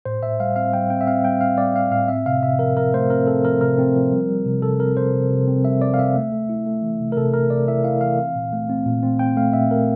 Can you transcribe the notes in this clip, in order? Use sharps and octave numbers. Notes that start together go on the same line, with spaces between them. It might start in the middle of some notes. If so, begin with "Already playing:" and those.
A2 C5
A2 E5
G3 F5
C4 F5
G3 G5
C4 G5
E5
C4 F5
G3 G5
C4 F5
G3 D5
C4 F5
A2 F5
C4 E5
C3 F5
C3 E5
F3 A#4
F3 A#4
A3 C5
C4 A#4
C4 A4
F3 A#4
C3 A#4
C4
F3
G3
G3
C3
C3 A4
C4 A#4
C3 C5
C3
C3
C4
G3 E5
C3 D5
F5
C3 E5
A3
A3
E4
A3
E3
C3
A#4
C3 A4
C3 A#4
C3 D5
E4 E5
E4 F5
E3 F5
C4
A#2
A3
C4
A#2
C4
C4 G5
A3 F5
A#2 E5
A3 A#4